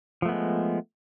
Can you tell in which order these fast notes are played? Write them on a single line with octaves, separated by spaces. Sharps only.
F3 A3 B3 G#3